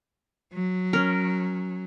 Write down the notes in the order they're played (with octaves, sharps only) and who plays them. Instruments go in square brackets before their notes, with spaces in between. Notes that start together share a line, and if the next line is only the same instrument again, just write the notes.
[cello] F#3
[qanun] C#4 A#4